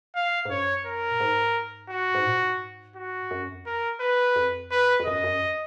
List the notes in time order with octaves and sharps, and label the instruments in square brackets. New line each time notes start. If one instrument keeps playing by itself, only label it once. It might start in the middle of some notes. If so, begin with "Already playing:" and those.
[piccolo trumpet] F5
[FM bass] G#2
[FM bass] F#2 [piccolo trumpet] C#5
[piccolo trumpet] A#4
[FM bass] A#2
G#2
[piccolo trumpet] F#4
[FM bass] G#2
A#2
G#2
[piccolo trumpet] F#4
[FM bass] F#2
F2
[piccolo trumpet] A#4
B4
[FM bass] F2
[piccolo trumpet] B4
[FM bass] F2
[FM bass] F#2 [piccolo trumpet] D#5
[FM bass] F#2